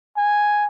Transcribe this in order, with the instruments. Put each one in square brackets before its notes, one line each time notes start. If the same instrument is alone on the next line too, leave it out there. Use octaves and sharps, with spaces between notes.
[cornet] G#5